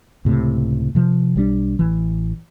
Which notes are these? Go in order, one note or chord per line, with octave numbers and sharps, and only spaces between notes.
C#2 A2 C3
C3 F3
B1 G3 C4 D4
A1 E3